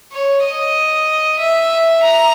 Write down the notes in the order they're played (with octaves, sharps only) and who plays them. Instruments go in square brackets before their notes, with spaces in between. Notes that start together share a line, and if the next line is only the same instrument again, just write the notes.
[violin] C#5
D#5
E5
A#5